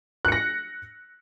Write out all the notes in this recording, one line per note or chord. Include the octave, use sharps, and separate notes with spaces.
F#6 A#6 C#7